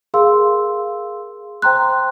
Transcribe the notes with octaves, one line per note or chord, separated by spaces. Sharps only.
G#4 A#4 F5 C6 E6
C5 G5 A#5 C6 F#6